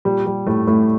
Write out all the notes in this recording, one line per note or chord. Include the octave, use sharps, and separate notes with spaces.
A#2 G3
G3
A2 A3
A2 A3